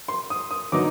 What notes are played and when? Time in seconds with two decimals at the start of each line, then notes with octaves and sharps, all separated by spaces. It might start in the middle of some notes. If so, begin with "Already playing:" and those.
0.08 C6
0.30 D#6
0.51 D#6
0.72 D3 F#3 B3 D#4 D6